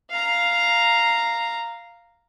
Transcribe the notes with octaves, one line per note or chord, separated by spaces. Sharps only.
F5 A#5